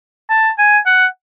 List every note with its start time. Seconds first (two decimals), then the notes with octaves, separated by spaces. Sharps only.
0.30 A5
0.59 G#5
0.86 F#5